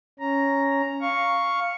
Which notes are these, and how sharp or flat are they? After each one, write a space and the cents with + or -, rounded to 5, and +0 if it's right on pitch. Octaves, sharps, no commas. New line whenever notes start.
C#4 +0 A#5 +0
F5 +0 C#6 +0